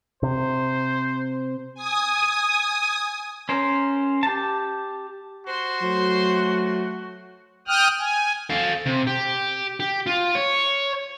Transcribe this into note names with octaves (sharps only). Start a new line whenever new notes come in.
C3 C5
G#5 D#6
C#4 A#4 C5
G4 A5
F#4 C5 C6
F#3 A3
G5 D#6 F6 F#6
G#5
A4 F5
C3
G4
G4
F4
C#5